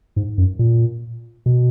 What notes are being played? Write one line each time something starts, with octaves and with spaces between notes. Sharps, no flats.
G#2
F#2
A#2
B2